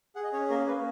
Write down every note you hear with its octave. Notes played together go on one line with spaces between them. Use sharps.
G#4 F#5
D#5
C#4 C#5
A#3 A#4
A#3 B4